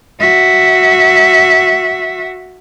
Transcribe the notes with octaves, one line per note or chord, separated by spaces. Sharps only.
F#4 E5